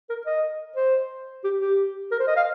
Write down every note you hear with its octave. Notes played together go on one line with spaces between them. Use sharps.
A#4
D#5
C5
G4
G4
A#4
C5
D#5
F5